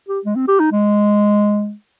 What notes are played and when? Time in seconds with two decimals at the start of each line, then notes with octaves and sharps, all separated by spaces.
0.09 G4
0.25 G#3
0.36 C4
0.48 G4
0.60 D#4
0.72 G#3